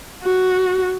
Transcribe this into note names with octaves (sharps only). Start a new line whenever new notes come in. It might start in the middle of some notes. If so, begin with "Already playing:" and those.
F#4